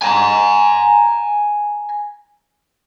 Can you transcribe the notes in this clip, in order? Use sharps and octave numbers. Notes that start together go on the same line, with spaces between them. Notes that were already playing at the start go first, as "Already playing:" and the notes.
G#5 A#5